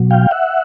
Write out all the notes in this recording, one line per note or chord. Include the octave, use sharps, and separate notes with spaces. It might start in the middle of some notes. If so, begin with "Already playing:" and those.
Already playing: B2 F#3
F5 G5
E5 F#5